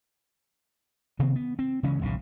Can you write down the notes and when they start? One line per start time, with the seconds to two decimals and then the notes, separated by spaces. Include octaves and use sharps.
1.19 C3 D#3 B3 C4
1.36 B3
1.59 C4
1.83 C#3 E3 G#3 C#4
2.01 D#1 B1 A2 C#3